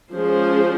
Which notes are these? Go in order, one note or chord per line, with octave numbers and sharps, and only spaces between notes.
F3 G#3 C#4 G#4 C5